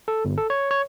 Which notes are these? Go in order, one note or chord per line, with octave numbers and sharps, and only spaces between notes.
A4
G1
A4
C#5
C#5